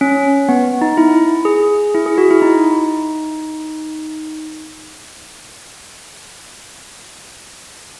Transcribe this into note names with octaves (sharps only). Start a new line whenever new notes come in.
C#4
B3
D#4
E4
G#4
E4
G#4
F#4
E4
D#4